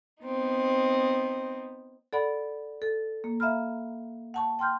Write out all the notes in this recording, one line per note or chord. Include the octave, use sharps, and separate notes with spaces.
B3 C4 D#4
A4 D5 F#5 B5
A4
A#3
E5 F5 A#5 B5 F6
F#5 A5 C#6
G5 C6 F6 G6